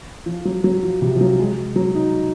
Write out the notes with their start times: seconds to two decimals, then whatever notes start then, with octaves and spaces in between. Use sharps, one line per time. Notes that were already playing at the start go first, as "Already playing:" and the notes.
0.26 F3
0.45 F#3
0.64 F#3
0.83 F3
1.02 C3
1.15 F3
1.21 F#3
1.39 G#3
1.76 F#3
1.95 D#4